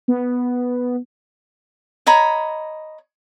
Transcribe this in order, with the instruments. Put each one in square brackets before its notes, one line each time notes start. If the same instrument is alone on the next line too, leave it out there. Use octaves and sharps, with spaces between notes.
[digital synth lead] B3
[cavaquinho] C#5 D#5 A#5 B5